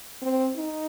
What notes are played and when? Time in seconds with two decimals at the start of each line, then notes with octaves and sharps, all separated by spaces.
0.22 C4
0.57 D#4